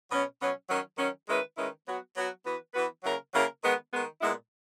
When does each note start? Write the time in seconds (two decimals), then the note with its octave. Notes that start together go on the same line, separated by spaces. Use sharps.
0.10 B2 F#3 C#4
0.39 B2 F#3 C#4
0.69 D#3 F#3 C#4
0.98 D#3 F#3 C#4
1.27 D#3 G#3 C#4 E4 B4
1.57 D#3 G#3 C#4 E4 B4
1.86 F#3 B3 F#4
2.16 F#3 B3 F#4
2.45 E3 B3 F#4 B4
2.74 E3 B3 F#4 B4
3.04 C#3 F#3 A#3 E4 A#4
3.33 C#3 F#3 A#3 E4 A#4
3.62 D#3 G#3 B3
3.92 D#3 G#3 B3
4.21 A#2 G#3 B3 E4